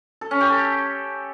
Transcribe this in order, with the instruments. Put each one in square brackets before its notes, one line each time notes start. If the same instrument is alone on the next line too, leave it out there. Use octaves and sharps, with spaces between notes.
[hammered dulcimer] A4
C#4
G4
A4